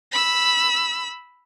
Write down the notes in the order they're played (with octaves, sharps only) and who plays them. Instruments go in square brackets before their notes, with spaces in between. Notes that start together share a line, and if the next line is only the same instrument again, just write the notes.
[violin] B5 E6